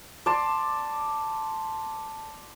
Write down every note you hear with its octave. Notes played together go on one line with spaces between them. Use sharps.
D5 A5 C6